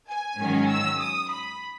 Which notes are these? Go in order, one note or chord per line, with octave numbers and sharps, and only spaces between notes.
G#5
G#2 D#3 F#3 C#4
E6
D#6
B5